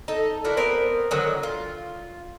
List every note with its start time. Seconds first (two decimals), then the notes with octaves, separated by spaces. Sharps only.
0.08 D#4 A4
0.44 D4 E4 F#4 A#4
0.57 B3 C4 A#4 B4
1.11 D3 D#3 F#3 F#4
1.43 F4